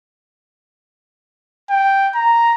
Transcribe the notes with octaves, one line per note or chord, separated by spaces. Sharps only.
G5
A#5